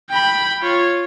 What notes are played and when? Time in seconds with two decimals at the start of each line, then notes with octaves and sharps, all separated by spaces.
0.10 G5 B5
0.62 F4 C#5